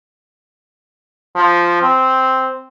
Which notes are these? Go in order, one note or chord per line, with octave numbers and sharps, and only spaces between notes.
F3
C4